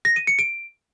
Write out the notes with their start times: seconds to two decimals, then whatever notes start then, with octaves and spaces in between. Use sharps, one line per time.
0.05 A#6
0.16 D#7
0.27 C#7
0.39 D7